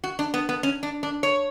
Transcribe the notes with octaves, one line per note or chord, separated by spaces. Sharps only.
F#4
D4
B3
B3
C#4
D4
D4
C#5